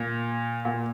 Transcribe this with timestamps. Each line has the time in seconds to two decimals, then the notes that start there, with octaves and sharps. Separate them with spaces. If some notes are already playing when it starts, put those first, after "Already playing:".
Already playing: A#2
0.65 A#2